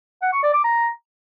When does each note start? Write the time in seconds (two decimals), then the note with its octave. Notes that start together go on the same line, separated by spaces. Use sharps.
0.22 F#5
0.32 C#6
0.43 D5
0.53 D6
0.64 A#5